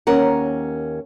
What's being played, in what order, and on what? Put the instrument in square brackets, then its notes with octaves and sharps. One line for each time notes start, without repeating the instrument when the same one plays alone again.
[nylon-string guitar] D#2 C#4 A#4 F#5